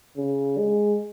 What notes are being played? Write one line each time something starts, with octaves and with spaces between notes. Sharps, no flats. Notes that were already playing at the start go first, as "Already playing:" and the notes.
C#3
G#3